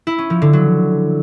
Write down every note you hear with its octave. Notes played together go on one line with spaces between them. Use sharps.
E4
C#4
F3
D3
F#3